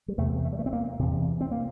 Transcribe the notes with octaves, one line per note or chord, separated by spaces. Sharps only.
G3
E2 C3 A3
A3
G3
A3
C4
A#3
E2 C3
C4
A#3